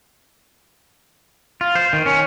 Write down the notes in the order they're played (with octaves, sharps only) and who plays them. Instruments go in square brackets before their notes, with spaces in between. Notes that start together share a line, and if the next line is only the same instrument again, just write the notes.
[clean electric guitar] F4
C5
D#3
C#4